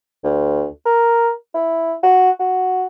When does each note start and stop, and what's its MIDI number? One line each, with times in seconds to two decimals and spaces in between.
0.24 0.66 38
0.85 1.30 70
1.54 1.95 64
2.03 2.31 66
2.40 2.86 66